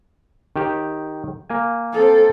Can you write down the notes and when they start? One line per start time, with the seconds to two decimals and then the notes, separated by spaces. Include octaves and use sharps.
0.56 D#3 G4
1.50 A#3 G#5
1.93 C4 A4